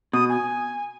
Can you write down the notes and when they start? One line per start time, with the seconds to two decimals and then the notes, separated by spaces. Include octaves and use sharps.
0.13 B2 D#6
0.29 G#5